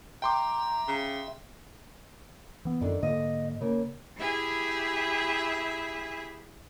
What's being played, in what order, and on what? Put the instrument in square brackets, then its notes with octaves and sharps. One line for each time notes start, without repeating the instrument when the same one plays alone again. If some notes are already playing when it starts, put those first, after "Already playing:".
[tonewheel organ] E5 [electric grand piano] G5 C6 D6 [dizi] A#5
[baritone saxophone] C#3
[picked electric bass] E3 B3
[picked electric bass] F#2 [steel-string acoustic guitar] D3 D#3
[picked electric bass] G#2 D3 A#3 [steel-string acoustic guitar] D#5
[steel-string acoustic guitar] C#3 A#3
[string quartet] E4 G4 G#4 E5